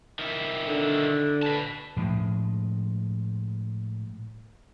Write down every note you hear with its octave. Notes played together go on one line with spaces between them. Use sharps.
D#3 E4
D3
B4 A5
A2 F3 G#3